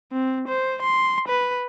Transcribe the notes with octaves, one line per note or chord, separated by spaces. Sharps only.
C4
C5
C6
B4